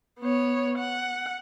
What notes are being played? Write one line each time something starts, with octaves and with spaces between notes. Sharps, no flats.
B3 C#5
F#5